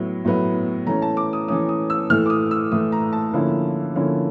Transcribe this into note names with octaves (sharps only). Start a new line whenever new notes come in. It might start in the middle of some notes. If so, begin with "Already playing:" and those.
Already playing: A2 F#3 B3 E4
A2 F#3 B3 E4
E3 A3 C#4 A#5
A5
D6
D#6
E3 A3 C#4 D#6
D#6
E6
A2 E3 A3 F6
D6
D#6
E6
A2 E3 A3 D#6
A#5
A5
D3 F3 A#3 C#4 E4
D3 F3 A#3 C#4 E4